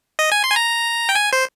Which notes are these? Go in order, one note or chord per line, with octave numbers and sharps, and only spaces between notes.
D#5
G#5
C6
G#5
A#5
G5
G#5
C5